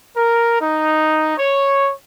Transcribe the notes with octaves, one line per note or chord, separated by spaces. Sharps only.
A#4
D#4
C#5